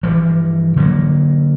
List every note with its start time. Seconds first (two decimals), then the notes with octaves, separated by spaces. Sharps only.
0.03 G2 E3 F3
0.76 D3 F#3 G#3 A#3